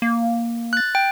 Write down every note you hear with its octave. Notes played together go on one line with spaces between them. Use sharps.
A#3
F#6 A6
G5